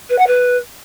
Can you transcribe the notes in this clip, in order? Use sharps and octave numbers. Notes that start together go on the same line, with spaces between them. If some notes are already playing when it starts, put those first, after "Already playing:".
B4
F#5
B4